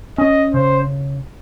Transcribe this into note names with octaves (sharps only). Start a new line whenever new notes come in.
C#4 D#5
C#3 C5